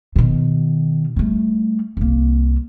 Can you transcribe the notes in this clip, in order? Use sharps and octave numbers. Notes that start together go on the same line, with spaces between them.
B2 D#3
G3 A3
C2 A#3